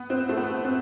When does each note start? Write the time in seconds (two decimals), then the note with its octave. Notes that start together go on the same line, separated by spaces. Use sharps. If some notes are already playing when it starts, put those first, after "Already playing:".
Already playing: B3
0.10 C4
0.29 A3
0.37 B3
0.65 C4